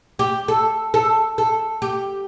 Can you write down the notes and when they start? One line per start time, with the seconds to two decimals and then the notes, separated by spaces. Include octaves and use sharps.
0.19 G4
0.48 A4
0.94 A4
1.38 A4
1.82 G4